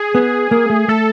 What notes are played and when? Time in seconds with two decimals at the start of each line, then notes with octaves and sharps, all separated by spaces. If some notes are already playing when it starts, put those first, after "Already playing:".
Already playing: G#4
0.15 B3
0.51 A#3
0.70 A3
0.88 A3 A4